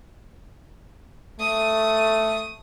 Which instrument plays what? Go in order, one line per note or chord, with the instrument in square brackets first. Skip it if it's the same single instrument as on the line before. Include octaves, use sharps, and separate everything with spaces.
[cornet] A3 [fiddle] D#6